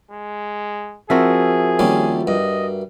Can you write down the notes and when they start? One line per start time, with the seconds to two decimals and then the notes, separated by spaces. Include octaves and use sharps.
0.10 G#3
1.10 F3 C4 E4 F#4 G#4 A#4 E5
1.79 D#2 G3 C#4
2.27 G2 D#5